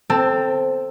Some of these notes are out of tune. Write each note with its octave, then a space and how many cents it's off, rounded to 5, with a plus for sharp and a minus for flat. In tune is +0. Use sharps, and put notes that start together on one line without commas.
C4 +0 A4 +0 A5 +40